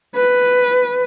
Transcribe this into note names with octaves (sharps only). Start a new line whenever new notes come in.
B4